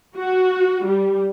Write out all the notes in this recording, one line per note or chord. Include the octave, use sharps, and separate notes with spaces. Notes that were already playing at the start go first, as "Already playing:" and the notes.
F#4
G3